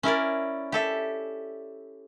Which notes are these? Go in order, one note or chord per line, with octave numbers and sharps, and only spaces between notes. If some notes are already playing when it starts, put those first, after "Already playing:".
C#4 E4 A#4 D5
G4 A4 E5